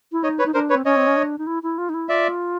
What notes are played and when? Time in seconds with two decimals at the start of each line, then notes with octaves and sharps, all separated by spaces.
0.12 E4
0.23 D#4 C#5 D#5
0.39 B4 C#5
0.45 D#4
0.54 D4 A#4 C5
0.70 B4 C#5
0.75 C4
0.85 C#4 C#5 D#5
0.96 C4
1.07 C#4
1.17 D4
1.38 D#4
1.47 E4
1.63 E4
1.78 F4
1.89 D#4
1.94 E4
2.09 F4 D5 E5